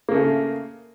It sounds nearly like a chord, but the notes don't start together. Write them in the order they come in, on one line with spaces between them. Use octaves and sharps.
A#3 C#3 A3